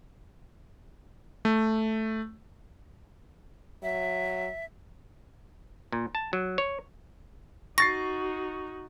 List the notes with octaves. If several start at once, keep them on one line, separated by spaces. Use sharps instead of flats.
A3
F#3 E5
A#2
A5
F#3
C#5
D#4 F#4 C#6 A6 A#6 C7